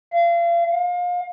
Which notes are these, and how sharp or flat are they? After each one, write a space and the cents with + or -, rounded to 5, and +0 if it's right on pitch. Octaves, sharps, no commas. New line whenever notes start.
F5 -35
F5 +30